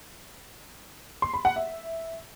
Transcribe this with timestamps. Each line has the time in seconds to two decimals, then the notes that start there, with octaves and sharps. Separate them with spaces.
1.22 C6
1.34 B5
1.45 F#5
1.56 E5